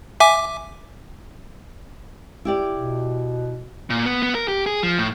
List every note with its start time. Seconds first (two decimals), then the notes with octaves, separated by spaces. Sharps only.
0.20 E5 G#5 D6
2.45 E4 G4 D5
2.74 B2
3.90 A#2
4.06 B3
4.22 B3
4.35 A#4
4.48 G4
4.66 G#4
4.83 F3
4.98 A2